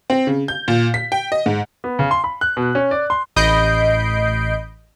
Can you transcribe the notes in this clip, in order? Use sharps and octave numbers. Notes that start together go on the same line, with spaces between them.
C4
C#3
G6
A#2
B6
G5
D#5
G#2
B3
C#3
C6
B5
F#6
B2
C#4
D5
C6
A1 D#5 B5 G6 C7 D7